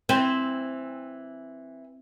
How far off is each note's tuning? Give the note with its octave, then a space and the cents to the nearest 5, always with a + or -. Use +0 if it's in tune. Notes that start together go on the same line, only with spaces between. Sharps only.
E3 +0 C4 +0 B4 +5